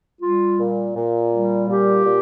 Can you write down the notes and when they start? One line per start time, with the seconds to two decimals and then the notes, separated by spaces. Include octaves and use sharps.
0.21 G3 F4
0.58 A#2
0.95 A#2
1.31 G3
1.68 A#2 G4
2.04 A#2